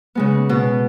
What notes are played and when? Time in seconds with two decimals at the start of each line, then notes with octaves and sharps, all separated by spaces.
0.15 C#3 G#3 B3
0.49 B2